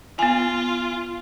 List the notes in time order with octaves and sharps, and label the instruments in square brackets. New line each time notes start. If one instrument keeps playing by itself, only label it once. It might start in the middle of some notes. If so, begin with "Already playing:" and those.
[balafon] B3 G#5 [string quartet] F4